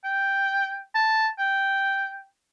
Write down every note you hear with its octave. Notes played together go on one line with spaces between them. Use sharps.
G5
A5
G5